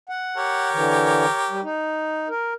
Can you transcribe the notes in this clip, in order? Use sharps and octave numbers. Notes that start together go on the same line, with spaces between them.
F#5
G4 A#4 C#5
D3 E3
G3
D#4
A#4